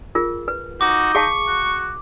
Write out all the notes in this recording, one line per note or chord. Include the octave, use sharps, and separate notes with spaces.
F4 G#4 A#4
B4
D#4 F#4 D6
G#4 F5 A5 C#6
F#4